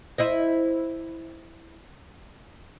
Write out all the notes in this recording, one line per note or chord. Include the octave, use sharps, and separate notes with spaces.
E4 C5 D#5